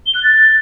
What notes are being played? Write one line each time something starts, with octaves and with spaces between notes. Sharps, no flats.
G7
F#6
A6